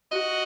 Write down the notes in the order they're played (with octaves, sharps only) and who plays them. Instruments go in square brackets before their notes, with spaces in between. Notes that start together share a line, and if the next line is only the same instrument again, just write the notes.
[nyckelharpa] F#4 [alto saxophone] D#5